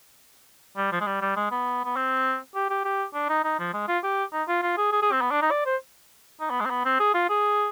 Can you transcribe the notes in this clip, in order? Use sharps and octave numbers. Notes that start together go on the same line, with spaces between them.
G3
F3
G#3
G3
G3
G#3
B3
B3
C4
G4
G4
G4
D4
D#4
D#4
F3
G#3
F4
G4
D#4
F4
F4
G#4
G#4
G#4
C4
B3
D4
D#4
D5
C5
D#4
B3
G#3
C4
B3
C4
G#4
F4
G#4